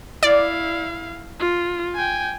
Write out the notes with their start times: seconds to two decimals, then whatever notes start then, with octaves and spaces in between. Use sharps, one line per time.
0.23 E4 D5 F5
1.40 F4
1.96 G5 G#5